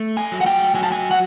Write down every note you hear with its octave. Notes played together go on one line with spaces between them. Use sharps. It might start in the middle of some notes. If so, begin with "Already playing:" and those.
Already playing: A3
G#5
F#3
F#5
G5
F#3 G#5
A5
G#5
F#5